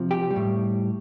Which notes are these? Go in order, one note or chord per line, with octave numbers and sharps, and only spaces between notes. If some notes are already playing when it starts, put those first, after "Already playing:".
Already playing: C3 F3
G4
G3
A2